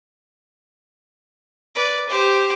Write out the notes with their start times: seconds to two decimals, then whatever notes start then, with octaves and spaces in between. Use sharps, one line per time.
1.75 B4 D5
2.09 G4 C5